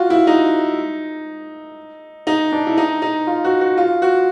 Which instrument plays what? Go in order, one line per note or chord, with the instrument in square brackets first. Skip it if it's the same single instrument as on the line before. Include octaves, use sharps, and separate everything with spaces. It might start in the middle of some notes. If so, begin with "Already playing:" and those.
Already playing: [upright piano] F4 F#4
E4
D#4
D#4
D4
E4
D#4
D#4
F4
F#4
F#4
F4
F#4